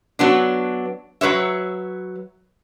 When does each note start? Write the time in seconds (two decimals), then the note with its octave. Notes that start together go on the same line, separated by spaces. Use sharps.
0.19 F#3 B3 D4
1.21 F#3 B4 C#5 E5